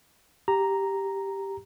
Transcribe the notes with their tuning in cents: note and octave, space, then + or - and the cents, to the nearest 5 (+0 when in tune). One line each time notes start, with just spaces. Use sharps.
G4 +0 A#5 +0